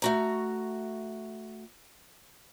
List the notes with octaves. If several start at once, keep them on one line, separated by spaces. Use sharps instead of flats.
A3 F#4 A#5